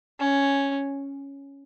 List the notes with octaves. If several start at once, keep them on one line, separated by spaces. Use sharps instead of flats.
C#4